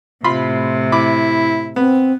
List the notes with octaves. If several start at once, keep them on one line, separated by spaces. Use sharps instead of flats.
A2 C3 F4 B5 C6
E4 B5 D6
B3 C4